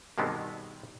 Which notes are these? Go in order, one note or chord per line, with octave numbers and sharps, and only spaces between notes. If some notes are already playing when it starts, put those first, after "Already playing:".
G2 B2 D#3 G#3 B3 C4